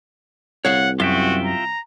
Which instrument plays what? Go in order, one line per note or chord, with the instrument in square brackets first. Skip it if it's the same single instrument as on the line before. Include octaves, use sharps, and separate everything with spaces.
[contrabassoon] C2 [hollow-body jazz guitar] C#5 F5 [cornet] F#5
[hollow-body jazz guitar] F#2 [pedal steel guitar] F4 E5 G5 [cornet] F#4
[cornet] A#5